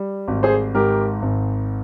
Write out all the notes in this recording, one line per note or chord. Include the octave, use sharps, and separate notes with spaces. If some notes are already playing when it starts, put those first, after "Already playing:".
Already playing: G3
G#1
G#4 C5
G#2 G4 A#4
G#1